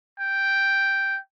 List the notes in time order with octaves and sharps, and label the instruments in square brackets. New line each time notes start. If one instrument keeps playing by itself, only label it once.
[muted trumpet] G5